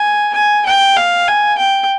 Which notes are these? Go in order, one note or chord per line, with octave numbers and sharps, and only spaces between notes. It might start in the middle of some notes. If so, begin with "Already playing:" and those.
Already playing: G#5
G#5
G5
F5
G#5
G5